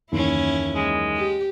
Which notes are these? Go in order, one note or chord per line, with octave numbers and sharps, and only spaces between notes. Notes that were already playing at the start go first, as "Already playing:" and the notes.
F#1 D#2 E3 C#4 E4
G#3
G4